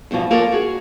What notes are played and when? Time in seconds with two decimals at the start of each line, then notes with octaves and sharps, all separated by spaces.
0.11 E2 G2 B2 F3
0.31 A#3 F4 A4 A#4 C#5 D5
0.52 F#4 G#4